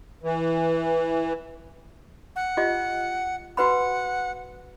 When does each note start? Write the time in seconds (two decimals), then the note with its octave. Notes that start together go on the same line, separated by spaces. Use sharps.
0.23 E3
2.36 F#5
2.57 F4 G4 D#5
3.57 F#4 B4 F#5 B5